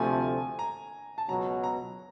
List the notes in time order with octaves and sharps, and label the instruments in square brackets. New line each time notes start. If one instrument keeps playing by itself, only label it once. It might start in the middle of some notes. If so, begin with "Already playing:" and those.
Already playing: [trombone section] D2 C3 F3 A3 [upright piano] G#5
[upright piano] A#5
A5
[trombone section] C#2 B2 F#3 [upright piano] A#5
[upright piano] A#5